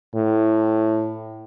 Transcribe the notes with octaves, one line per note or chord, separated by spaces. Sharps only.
A2